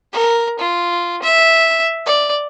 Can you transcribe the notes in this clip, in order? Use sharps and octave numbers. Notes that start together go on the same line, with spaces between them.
A#4
F4
E5
D5